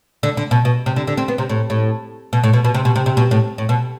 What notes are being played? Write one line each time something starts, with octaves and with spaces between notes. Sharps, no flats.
D3
D3
B2
B2
C3
D3
D3
C4
B3
C3
A2
A2
B2
A2
B2
B2
C3
B2
C3
C3
B2
A2
A2
B2